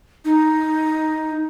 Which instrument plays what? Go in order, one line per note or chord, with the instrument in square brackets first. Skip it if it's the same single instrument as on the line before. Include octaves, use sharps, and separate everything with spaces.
[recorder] D#4